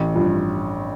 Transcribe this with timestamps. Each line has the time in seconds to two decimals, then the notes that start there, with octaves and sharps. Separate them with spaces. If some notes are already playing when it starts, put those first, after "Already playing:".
Already playing: A1
0.14 G2 F3